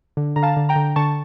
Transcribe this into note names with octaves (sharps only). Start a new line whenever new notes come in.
D3
D3 A#5
F5 A5
D3
G5 A#5
D3
D3 A5 C#6